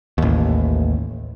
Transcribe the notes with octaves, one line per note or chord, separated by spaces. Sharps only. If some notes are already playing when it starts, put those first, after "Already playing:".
A1 D#2